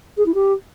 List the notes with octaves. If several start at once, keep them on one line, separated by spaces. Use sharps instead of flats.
G#4
E4
G4